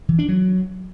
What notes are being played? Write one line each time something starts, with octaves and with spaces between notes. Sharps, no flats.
E3
D4
F#3